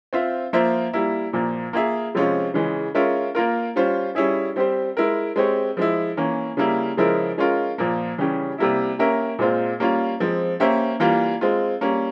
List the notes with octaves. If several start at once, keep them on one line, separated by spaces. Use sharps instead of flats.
C4 F4 C5 E5
F3 A#3 F4 C5 E5
G3 A#3 E4
A#2 F3 A#3
A#3 F4 G#4 E5
C3 F3 G#3 C#4 F4
C#3 E3 G#3
G#3 C#4 F4 A#4 E5
A#3 F4 A#4
G3 C#4 F4 C5
G3 C#4 E4 G#4
G3 C4 G4 C5
G#3 E4 A#4
G#3 C4 G4 C#5
F3 G#3 E4
E3 A#3 C#4
C#3 G3 A#3 E4
C#3 F3 G#3 E4 A#4
G#3 C#4 F4 A#4
A#2 F3 A#3
C#3 E3 G3 C#4 G4
C3 G3 A#3 E4
A#3 C#4 G4 A#4 E5
A#2 G#3 C4 F4 C5
G3 A#3 C#4 F4
F3 G#3 C4
A#3 C#4 G4 C5 E5
E3 G3 A#3 F4
G#3 C4 F4
G3 A#3 C#4